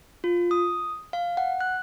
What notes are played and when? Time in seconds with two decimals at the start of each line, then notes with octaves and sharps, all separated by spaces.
0.24 F4
0.51 D#6
1.13 F5
1.37 F#5
1.61 F#6